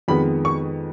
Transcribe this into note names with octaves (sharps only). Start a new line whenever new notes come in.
F2 D#3 G#3 B3 B5
C#6